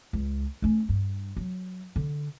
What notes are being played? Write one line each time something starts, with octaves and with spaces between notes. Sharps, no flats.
C#2
A3 C#4
G2
F#3
D3